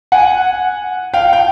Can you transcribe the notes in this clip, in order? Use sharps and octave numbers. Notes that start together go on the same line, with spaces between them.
F#5 G#5
F5 G5
G5